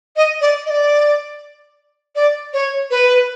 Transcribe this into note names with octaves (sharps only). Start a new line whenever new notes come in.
D#5
D5
D#5
D5
D5
C#5
B4